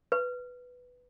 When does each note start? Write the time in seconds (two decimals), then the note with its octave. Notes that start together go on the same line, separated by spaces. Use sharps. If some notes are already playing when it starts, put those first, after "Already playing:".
0.12 B4